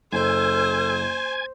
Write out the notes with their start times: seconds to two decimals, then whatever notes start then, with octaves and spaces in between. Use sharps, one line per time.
0.12 F#1 A4 C5 G#5 G#6